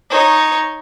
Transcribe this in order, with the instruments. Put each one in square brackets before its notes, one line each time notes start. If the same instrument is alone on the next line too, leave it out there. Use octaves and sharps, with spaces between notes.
[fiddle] D#4 C#5